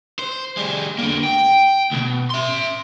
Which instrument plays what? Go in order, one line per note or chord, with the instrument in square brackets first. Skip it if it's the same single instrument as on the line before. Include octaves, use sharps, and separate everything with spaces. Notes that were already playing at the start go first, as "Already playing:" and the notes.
[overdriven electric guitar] C5
G3 G#4
D3 A#3
G5
D2 B2
E5 C6